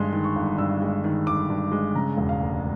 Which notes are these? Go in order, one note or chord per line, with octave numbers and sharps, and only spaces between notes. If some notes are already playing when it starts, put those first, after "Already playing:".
Already playing: G1 G2 D#3 G#3 C6
D#3
C#6
G1
G2 E6
G#3
D#3
G1 D6
G2
G#3
C#3 A#5
E1
F5
D2